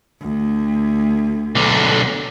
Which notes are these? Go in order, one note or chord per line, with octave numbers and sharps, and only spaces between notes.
D2
B1 D3